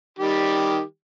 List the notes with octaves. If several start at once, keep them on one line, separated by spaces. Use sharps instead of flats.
D#3 G3 G4